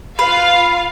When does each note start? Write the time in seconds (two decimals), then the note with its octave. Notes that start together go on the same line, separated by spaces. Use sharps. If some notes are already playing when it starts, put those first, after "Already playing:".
0.19 F4 B4 F5